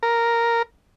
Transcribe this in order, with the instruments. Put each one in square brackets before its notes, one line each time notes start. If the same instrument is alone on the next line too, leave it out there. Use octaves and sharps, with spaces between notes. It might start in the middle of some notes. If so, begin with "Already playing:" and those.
[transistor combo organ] A#4